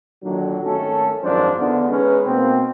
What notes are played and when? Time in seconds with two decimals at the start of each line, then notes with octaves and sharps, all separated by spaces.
0.24 A#2 D3 D#3 F#3
0.64 G#1 D#3 A3 C#4 A4
1.23 G#1 F#2 F3 D4 A#4 C5
1.58 E2 D3
1.90 G#3 C#4 D#4 B4
2.26 B2 A#3 C4